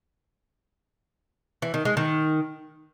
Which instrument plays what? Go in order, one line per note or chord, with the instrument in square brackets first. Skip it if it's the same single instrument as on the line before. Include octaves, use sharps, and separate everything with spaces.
[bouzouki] E3
D#3
G#3
D#3